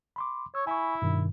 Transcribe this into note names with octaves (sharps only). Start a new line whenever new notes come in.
B5 C6 D6
C#5 E6
E4 G#5 B5 C#6
G2 B2 D#3